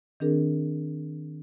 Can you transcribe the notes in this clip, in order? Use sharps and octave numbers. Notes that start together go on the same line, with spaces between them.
D#3 C4 D4 G#4 A#4